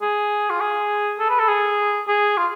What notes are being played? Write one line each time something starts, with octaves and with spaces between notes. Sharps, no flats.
G#4
F4
G#4
A4
B4
A4
G#4
G#4
F4